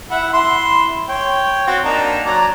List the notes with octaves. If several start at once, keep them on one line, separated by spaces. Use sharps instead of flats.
E4 E5 F#5
E4 C6
C#5 G5
C4 F#4
A#3 D4 D#4
F#3 D5 A#5